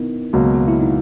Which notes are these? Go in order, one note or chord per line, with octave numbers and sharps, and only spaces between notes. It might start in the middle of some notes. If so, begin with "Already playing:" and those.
Already playing: B3 D#4 E4 A#4
C#2 B2 F#3 A#3
F#4
E4
D#4